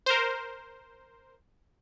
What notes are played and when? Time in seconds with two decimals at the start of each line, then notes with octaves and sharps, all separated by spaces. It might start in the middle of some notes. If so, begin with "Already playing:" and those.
0.06 A#4 C5